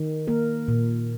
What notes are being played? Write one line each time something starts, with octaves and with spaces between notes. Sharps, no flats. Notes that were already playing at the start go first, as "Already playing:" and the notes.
Already playing: D#3
A#3 A#4
A#2